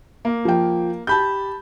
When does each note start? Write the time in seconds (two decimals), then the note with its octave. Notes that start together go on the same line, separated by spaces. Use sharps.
0.25 A#3
0.45 F3 G5
1.07 G4 A5 B5 G6